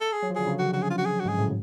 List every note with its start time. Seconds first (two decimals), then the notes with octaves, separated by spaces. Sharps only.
0.01 A4
0.12 G#4
0.22 F#3
0.30 F3
0.36 D3 G#4
0.47 C#3
0.59 F#4
0.73 F#4
0.82 G#4
0.90 F4
0.98 F#4
1.05 G#4
1.20 F#4
1.25 G#2 G#4
1.38 A2